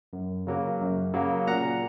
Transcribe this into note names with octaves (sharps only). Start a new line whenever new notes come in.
F#2
C#3 F#3 A#3
F#2
C#3 F#3 A#3
A#2 F#5 A#5